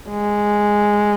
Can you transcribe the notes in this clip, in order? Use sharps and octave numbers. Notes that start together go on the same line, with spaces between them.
G#3